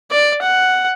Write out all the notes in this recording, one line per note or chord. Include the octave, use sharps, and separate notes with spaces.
D5
F#5